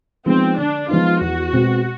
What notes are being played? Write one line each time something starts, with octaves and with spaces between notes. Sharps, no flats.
F3 G#3 B3 C4 D#4
D3 D4
F3 G#3 B3 D#4 F4
E2 F#4
B2 G#3 C4